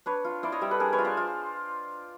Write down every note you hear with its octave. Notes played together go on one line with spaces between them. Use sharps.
D4 B4 C#5
F4
E4 C5 D5
C#5 D#5
G3 D5 E5
A4 B4
D4 G#4 A#4
B4 C#5
F4
C5 D5
F4